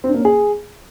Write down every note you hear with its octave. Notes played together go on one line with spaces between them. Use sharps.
C4
D4
A#3
C#4
G#4